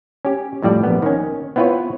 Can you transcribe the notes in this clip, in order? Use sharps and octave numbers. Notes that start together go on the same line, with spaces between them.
C#4 G4
F2 A2 G3 D5
A#1 B3
D#3 C#4
B3 C4 E4 F4 B4 C#5